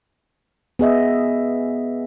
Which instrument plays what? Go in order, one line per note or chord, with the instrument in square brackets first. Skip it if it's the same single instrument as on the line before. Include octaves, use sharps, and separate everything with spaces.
[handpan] B3 G#4 D#5 E5